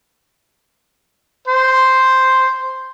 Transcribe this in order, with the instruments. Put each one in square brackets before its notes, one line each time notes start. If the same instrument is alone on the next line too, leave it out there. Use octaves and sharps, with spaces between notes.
[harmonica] C5